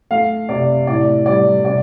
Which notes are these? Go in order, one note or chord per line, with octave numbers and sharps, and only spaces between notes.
A3 F5
C3 D5
A2 D5
G3 D5
C3 D5